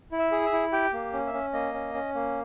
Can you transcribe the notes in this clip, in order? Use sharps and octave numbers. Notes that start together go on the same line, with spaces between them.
E4
E5
G#4
E5
E4
G4 G5
A#3
C#4
E5
C#4
A#3 D#5
C#4
C#4
A#3